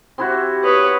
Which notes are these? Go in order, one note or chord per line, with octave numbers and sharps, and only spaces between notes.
C4 E4 F#4 G4
B4 C#5 D#6